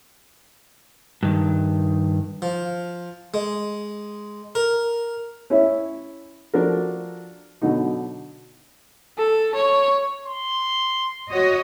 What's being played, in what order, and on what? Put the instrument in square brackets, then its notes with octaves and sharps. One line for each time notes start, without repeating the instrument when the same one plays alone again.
[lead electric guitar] G2 D#3
[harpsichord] F3
G#3
A#4
[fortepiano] C#4 E4 C#5 E5
F3 D4 F#4 A4 A#4
B2 D3 F#3 D#4
[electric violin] A4
C#5
[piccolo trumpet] C6
[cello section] F#4 C#5 D#5